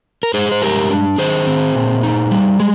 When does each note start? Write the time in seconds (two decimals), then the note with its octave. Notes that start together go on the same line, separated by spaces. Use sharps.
0.23 A#4
0.34 G#3 G#4 C5
0.51 C5
0.62 G2 G4 A#4
0.90 D4
1.18 D#3 G#4 C5
1.47 C4
1.75 A#2
2.03 D#4
2.31 G3
2.60 G#3